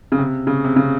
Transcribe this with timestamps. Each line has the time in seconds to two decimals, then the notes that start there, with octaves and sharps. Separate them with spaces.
0.12 C#3
0.18 C3
0.47 C#3
0.64 C3
0.76 C#3